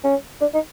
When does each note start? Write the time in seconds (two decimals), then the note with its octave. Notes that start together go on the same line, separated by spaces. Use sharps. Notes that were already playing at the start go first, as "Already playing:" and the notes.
0.04 C#4
0.41 D4
0.54 D#4